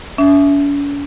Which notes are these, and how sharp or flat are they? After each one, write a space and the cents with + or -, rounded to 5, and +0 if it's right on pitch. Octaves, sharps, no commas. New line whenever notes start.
C#4 +45 E5 +0